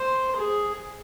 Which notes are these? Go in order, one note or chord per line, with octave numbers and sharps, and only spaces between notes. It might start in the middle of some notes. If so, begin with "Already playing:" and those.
Already playing: C5
G#4